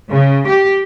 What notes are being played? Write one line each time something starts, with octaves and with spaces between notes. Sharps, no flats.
C#3
G4